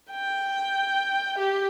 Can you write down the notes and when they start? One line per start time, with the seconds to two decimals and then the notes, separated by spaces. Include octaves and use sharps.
0.11 G5
1.38 G4